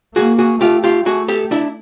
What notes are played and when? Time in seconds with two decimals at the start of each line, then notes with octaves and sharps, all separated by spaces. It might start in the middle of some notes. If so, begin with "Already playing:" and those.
0.16 A#3 F#4 G#4
0.39 F#4 G#4
0.61 A3 F4 G4
0.84 F4 G4
1.06 A3 F#4 G#4
1.28 G4 A4
1.51 D4 E4